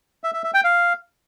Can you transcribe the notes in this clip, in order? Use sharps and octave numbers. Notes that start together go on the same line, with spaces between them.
E5
E5
E5
G5
F5